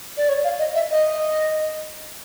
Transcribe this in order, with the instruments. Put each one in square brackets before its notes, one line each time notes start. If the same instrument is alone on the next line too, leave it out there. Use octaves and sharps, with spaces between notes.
[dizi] D5
C#5
F5
D#5
E5
D#5